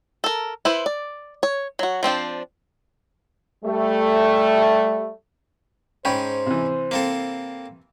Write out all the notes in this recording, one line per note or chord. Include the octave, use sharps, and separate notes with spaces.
A4 A#4
E4 B4 C5
D5
C#5
F#3 F#4
F3 C4 D4 G5
G3 A3
G#2 C#4 C5 C#5 G5 B5
C3 E3
A#3 C4 A4